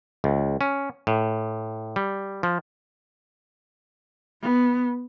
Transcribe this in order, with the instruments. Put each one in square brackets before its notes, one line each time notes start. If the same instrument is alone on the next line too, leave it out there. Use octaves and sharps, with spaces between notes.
[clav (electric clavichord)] C#2
C#4
A2
G3
F3
[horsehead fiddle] B3